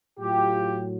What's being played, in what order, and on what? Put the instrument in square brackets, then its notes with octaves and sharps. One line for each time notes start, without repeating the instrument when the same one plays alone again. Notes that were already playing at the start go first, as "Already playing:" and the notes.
[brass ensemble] A2 F#3 F4 G4